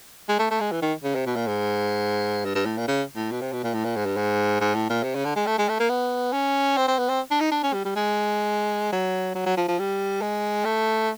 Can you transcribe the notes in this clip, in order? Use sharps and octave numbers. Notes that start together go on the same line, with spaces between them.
G#3
A3
A3
G#3
E3
D#3
C#3
C3
B2
A#2
G#2
G2
G2
A2
A#2
C#3
A2
B2
C3
B2
A#2
A2
A#2
G#2
G2
G#2
G#2
A2
A#2
C3
C#3
D3
G#3
A3
G#3
A3
A#3
B3
C#4
C4
C4
B3
C4
D4
D#4
D4
C#4
G3
G3
G#3
F#3
F#3
F#3
F3
F3
G3
G#3
A3